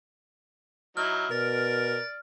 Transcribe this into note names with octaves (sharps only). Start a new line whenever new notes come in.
F#3 D#4 E4 F6
B2 A#4 D5